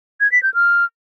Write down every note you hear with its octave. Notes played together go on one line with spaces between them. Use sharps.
G#6
B6
G6
F6